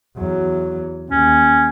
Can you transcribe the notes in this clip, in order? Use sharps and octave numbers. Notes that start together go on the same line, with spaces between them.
E2 F#3
D#2 C#4